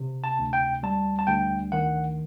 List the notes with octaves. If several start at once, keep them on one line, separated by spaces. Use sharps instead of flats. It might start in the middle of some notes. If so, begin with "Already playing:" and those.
Already playing: C3
A5
D2
G5
G3 A5
A5
D2 G5
D#3 F#5